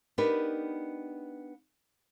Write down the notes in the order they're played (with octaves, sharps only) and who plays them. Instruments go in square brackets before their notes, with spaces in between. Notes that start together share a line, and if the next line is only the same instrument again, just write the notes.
[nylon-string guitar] B3 D4 D#4 G4 A#4 B4